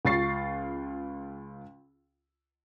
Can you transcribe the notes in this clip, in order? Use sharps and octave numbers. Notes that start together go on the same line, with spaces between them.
C#2 F4 C#6 A6 C7